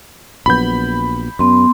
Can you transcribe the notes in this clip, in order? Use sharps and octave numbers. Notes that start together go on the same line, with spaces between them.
A#1 F#3 B3 B5 G6
F#2 B3 C6